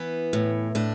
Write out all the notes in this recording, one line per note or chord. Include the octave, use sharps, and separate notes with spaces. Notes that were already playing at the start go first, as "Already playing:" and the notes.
Already playing: E3 B3
A2
A2 D4